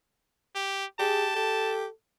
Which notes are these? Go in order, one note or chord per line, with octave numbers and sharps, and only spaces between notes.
G4
G4 G#4 A5
G4 A4